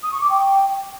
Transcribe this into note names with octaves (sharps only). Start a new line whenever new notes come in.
D#6
C#6
D6
G5